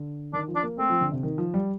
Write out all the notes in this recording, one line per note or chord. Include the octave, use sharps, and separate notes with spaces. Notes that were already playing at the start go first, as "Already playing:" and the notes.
Already playing: D3
D#3 D4
F3
D4
A#3
A3 C4
F3
D3
C3
D#3
F3
G3